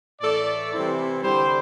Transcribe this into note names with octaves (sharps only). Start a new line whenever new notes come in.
A2 E3 A3 A4 D5
C3 E3 G3 C4 E4
D3 G3 E4 G4 C5